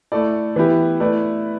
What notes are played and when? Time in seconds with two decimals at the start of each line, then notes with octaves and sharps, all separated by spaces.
0.12 A3 E4 A4 D5
0.56 E3 B3 E4 G4
1.00 A3 E4 B4 D5